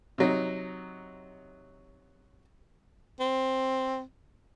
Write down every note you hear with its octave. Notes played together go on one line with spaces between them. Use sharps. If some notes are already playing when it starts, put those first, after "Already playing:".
C3 F#3 D#4
C4